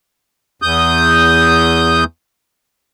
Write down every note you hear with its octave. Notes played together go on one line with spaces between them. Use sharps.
E2 D#6 G6